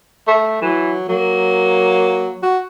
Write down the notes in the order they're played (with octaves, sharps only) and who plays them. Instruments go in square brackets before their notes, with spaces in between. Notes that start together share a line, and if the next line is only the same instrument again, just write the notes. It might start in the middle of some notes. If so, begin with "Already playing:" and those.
[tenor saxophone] A3
[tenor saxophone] E3 [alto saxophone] F#3
[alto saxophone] F#3 [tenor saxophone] A#3
[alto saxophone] F#4